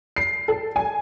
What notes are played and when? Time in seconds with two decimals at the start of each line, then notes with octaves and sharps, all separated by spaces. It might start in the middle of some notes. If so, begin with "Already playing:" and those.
0.16 C7
0.48 A4
0.76 G#5